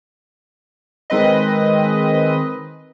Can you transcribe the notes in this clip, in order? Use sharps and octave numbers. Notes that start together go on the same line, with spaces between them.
D#3 G#3 C4 B4 D#5